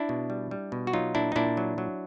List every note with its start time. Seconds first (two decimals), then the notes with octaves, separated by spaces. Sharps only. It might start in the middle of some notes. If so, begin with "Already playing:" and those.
Already playing: D4 E4
0.09 B2
0.30 G3
0.51 G3
0.72 B2
0.87 F#4
0.93 F#3 D#4 F4
1.15 A#2 D4 E4
1.32 D#4
1.36 A#2 D4 E4
1.57 F#3
1.78 F#3